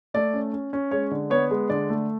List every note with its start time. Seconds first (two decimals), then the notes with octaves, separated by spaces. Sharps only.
0.14 A3 D5
0.34 C#4
0.53 C#4
0.73 C#4
0.91 G#3 C#5
1.11 D3
1.30 B3 C#5
1.51 G#3
1.70 D3 D5
1.90 A3